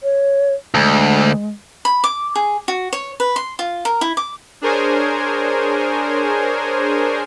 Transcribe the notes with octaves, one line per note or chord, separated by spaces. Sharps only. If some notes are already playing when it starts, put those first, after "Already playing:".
C#5
D2 G#3
B5
D6
G#4
F#4
C#5
B4
C6
F4
A#4
E4
D6
D4 G#4 A#4 C5 C#5 G#5